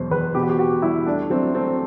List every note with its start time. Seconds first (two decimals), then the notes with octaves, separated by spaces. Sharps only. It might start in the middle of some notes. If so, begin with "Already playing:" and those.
Already playing: E2 B2 F#3 C5
0.11 E2 B4
0.35 B2 G4
0.42 F#4
0.50 G4
0.59 B2 F#4
0.82 G3 E4
1.06 A3 D4
1.30 F#3 C4
1.54 A3 C4